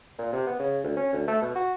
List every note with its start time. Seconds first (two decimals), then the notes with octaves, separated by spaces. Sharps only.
0.19 A#2
0.33 C3
0.47 B3
0.59 C#3
0.84 D2
0.97 C#4
1.13 D2
1.28 A3
1.42 B2
1.55 F#4